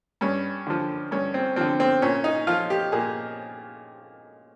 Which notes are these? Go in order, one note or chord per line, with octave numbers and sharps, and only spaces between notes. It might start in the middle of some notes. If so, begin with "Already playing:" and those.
G2 C#4
D3 F3
G2 C#4
C4
D3 F3 C4
C4
A#2 C#4
D#4
F3 F4
G4
A#2 G#4